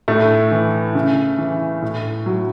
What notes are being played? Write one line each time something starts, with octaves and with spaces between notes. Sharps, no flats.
A2 A3
E3
C#3
E3
A2
F#3